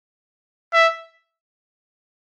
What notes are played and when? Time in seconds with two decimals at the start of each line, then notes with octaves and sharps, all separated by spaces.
0.73 E5